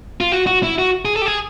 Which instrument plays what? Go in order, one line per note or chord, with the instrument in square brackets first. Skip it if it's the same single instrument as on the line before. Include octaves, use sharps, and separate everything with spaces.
[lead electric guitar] F4
F#4
F#4
E4
F#4
G#4
A4
G4
G#4